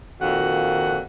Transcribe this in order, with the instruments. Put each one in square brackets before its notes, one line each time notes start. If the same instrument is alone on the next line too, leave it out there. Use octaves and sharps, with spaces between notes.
[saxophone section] F2 A#2 D#3 F#4 F#5